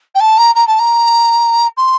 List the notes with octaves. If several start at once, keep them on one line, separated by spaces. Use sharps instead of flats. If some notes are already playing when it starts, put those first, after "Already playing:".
G5
A5
A#5
A#5
A5
A#5
C6